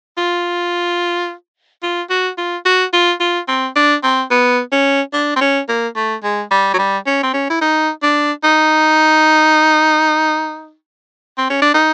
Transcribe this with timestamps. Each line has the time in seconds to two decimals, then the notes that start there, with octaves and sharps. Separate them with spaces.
0.18 F4
1.83 F4
2.10 F#4
2.38 F4
2.66 F#4
2.93 F4
3.20 F4
3.48 C4
3.76 D4
4.03 C4
4.31 B3
4.72 C#4
5.14 D4
5.36 C4
5.41 C#4
5.69 A#3
5.96 A3
6.24 G#3
6.51 G3
6.74 F#3
6.79 G3
7.07 C#4
7.23 C4
7.34 C#4
7.50 E4
7.61 D#4
8.03 D4
8.44 D#4
11.38 C4
11.50 C#4
11.62 D4
11.74 D#4